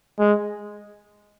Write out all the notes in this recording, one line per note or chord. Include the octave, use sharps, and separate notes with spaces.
G#3